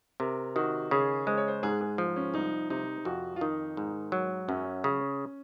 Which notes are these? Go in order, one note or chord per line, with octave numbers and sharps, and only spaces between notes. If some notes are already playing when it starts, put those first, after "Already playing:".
C3 A#4
D#3 F#4
C#3 G#4
G#3 C5
C#5
C5
G#2 G#4
G#4
F3
C#4
C2 D#4
C3 D#4
F2 F#4
F4
D#3 D#4
G#2
F#3
F#2 C#4
C#3